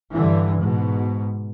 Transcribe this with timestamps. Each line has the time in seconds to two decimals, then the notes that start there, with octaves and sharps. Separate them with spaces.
0.12 G2 D3 E3
0.60 G#2 B2